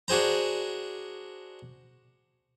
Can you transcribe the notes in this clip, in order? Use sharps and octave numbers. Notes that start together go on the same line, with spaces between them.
D4 F#4 G#4 C5 A#5